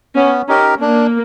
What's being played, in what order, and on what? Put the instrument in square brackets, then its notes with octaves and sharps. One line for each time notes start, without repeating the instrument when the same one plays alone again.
[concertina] B3 [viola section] C#4
[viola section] C#4 [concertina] D#4 G4 A#4
[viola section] A#3 [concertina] D4